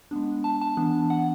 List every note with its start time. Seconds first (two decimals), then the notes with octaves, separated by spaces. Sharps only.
0.11 G#3 B3 D4
0.44 A5
0.61 A5
0.77 E3 B3 D4
1.10 F#5